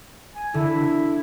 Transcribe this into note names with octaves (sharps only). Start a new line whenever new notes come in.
G#5
D3 E4